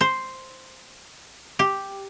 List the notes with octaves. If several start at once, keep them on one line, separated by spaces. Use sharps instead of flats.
C5
G4